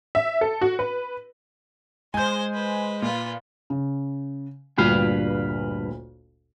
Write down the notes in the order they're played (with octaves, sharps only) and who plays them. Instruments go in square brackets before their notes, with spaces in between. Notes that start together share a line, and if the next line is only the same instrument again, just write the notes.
[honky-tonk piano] E5
A4
F#4
B4
[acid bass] G#3 [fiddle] C5 C6 [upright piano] G#5 G6
[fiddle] B4 C5
[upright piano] A#2 [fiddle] F4 B4
[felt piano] C#3
[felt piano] G1 D2 A#2 [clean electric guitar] G2 B4 F5